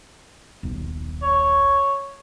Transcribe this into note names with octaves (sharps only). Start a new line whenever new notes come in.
D#1 B1
C#5